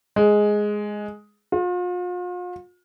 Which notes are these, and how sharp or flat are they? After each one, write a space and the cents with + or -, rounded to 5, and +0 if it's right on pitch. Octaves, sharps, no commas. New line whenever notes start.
G#3 +5
F4 +40